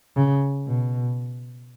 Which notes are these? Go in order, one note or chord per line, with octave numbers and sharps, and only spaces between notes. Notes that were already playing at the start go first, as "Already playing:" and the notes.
C#3
B2